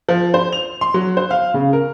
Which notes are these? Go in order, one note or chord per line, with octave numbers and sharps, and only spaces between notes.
F3
C5
F7
C6
F#3
C5
F5
C#3
A#4